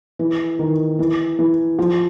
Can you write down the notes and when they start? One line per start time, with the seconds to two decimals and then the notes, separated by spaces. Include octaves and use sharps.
0.19 E3
0.59 D#3
0.99 E3
1.39 E3
1.79 F3